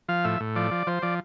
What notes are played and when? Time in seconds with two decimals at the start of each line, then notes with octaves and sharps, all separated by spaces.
0.09 F3 F5
0.24 A2 E5
0.40 A2
0.56 F3 D5
0.71 F3
0.87 F3 C5
1.02 F3 D5